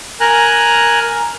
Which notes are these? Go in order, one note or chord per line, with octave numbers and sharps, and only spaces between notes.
A#4 G#5 A#5 F#6